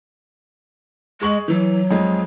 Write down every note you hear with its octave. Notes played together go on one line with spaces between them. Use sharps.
G#3 G#4 C#6 F#7
E3 F#3
F2 G#3